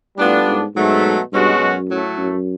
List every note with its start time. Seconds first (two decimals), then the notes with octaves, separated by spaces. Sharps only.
0.17 A2 G3 B3 D4 F4 A4
0.46 G#2
0.75 G#2 B2 F#3 A3
1.32 G2 B2 G#3 C#4 F#4
1.60 F#2
1.89 A2 F#3 A3
2.17 F#2